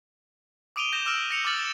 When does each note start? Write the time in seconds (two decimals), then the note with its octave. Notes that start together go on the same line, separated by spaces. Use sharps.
0.76 D6 D#6 D7 D#7 F7 G7
0.93 G6 A#6 E7
1.06 D6 E6 F6 D7
1.31 A#6 C#7 F7
1.45 D6 F6 A6 F#7
1.58 E7